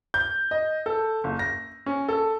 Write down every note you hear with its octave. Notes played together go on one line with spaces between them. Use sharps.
G6
D#5
A4
F#1
A#6
C#4
A4